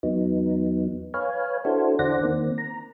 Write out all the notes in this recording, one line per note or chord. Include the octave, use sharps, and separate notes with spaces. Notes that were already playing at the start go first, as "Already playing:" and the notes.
E2 F#3 B3 D#4
B4 C#5 F5 G#5
D4 E4 F#4 A4 C5
E2 D3 C5 D5 F#5 A#6
D#3 A#3 C4
A#5